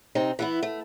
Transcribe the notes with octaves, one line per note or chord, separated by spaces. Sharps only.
C3 C4 D#4
E3 B3 E4
A3